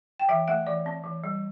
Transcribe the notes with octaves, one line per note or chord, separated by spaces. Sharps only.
G5
E3 E5
A3 E5
E3 D5
C4
E3
G3